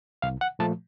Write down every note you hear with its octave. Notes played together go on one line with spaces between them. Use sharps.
C2 F5
F#5
A#2 F3 A3 A5